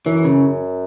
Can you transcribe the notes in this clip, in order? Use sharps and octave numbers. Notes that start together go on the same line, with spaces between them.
F#2 E3
C#3